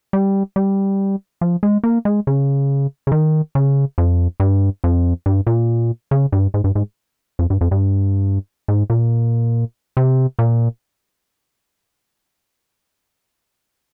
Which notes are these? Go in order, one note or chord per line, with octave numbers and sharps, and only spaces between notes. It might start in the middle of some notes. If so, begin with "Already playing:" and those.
G3
G3
F3
G#3
A#3
G#3
C#3
C#3
D#3
C#3
F2
G2
F2
G2
A#2
C#3
G2
G#2
G2
G#2
F2
G2
F2
G2
G#2
A#2
C3
A#2